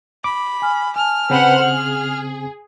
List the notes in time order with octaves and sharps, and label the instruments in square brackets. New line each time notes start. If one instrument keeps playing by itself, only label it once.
[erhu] B5 [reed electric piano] D6
[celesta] G#5 F6
[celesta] G#5 A5 [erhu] F6
[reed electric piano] C#3 C4 [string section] B4 C5 F#5
[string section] G#4 [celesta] F#7